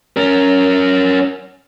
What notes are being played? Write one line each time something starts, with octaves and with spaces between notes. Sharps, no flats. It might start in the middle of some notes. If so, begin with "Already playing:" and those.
C#4 A#4